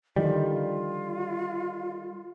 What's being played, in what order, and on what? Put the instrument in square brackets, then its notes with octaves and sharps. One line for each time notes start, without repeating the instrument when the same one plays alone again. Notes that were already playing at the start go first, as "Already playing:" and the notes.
[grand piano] D3 D#3 F3 [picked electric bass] G3 [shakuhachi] F4